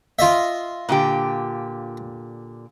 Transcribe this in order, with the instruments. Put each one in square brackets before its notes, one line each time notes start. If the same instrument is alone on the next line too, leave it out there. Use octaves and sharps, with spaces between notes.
[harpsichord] F4 D#5 E5
[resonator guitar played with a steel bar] A#2 D3 G4